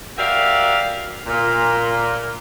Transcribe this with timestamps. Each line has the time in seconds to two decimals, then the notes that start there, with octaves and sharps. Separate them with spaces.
0.18 F#4 G4 A#4 D5 E5 F5
1.27 A#2